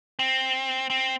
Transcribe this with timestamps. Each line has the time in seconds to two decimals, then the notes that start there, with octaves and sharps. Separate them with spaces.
0.19 C4
0.90 C4